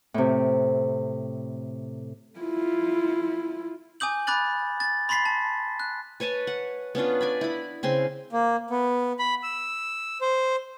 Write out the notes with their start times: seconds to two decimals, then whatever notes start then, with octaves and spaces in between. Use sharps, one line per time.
0.14 A2 C3
2.39 E4 F4
4.00 G#5 D6 D#6 G6 F#7
4.27 B5 D6 F#6 A6 F#7
4.80 A6
5.09 B5 C6 A6 B6 C7
5.25 A5
5.80 F#6
6.20 B4 C#5 G#5 A5
6.47 F#5
6.95 B3 C#4 D4 F4
7.21 D5 G#5 B5
7.41 E4 B5
7.83 C#3 C4 G#5 C6
8.32 A#3
8.70 B3
9.19 B5
9.43 E6
10.21 C5